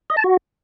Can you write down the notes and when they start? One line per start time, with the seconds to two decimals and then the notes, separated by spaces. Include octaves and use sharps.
0.10 D#5
0.17 A5
0.24 F#4